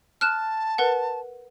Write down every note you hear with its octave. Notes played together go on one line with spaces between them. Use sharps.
A5 F6 F#6 E7
A#4 B4 F#5